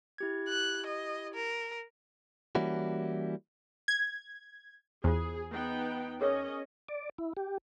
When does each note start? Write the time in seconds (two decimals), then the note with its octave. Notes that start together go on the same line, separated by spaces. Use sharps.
0.18 E4 G4 G#6
0.49 F#6
0.87 D#5
1.34 A#4
2.55 E3 G3 A#3 C#4 E4 F#4
3.88 G#6
5.04 E2 F4 G#4 C5
5.52 B3 D#4 G5
6.21 C#4 G#4 A#4 C#5 D#5
6.89 D5
7.18 E4
7.37 G4